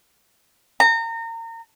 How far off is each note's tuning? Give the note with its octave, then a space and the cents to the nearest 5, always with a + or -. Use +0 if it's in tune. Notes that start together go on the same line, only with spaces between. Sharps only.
A#5 -30